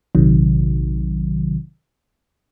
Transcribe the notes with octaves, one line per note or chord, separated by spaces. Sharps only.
A#1 C3 D#3 F#3